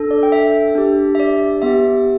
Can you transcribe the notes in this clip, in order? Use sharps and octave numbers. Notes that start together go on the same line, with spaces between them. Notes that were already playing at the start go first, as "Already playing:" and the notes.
Already playing: D4 A4
D5
G5
E5
D4 G4
E5
D5
B3 G4 E5